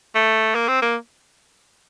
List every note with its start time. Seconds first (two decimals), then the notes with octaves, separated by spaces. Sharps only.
0.15 A3
0.55 A#3
0.68 C4
0.82 A#3